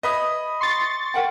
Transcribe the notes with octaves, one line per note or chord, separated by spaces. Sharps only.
B4 C#5 D#5 E5 B5 D#6
C6 C#6 A6
A#4 F#5 G5